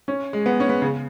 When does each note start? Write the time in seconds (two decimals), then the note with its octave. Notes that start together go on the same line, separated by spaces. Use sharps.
0.08 C#4
0.33 G#3
0.46 B3
0.60 C#4
0.69 B3
0.82 C#3